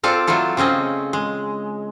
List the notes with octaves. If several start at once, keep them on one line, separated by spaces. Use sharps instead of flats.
C4 F4 A4 D5
F#3 A3 E4 F4 A4
C#3 C4 C#4 D#5
G#3